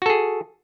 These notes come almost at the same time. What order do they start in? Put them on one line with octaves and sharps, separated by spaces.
F#4 A4 G#4